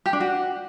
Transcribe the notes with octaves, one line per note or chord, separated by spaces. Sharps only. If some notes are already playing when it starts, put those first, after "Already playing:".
G4
D4
F#4